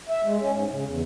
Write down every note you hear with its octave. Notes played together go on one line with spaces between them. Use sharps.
E5
G#3
C#4
G#2
C#3
E2